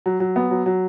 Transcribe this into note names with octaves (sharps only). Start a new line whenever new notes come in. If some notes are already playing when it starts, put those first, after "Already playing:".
F#3
F#3
B3
F#3
F#3